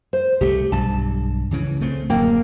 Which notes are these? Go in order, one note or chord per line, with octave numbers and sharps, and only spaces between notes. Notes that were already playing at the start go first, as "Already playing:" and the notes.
C5
C2 G3 A3 G4
B1 G2 A5
C#2 C#3 E3
C#3 A3 C4
D1 F#2 A#3 G5